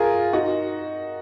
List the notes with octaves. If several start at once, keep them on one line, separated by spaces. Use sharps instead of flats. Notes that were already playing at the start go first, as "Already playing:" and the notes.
Already playing: F4 G#4 A#4
D#4 F#4